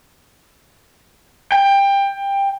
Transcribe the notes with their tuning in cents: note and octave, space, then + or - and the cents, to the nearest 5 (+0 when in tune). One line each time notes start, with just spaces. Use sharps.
G5 +20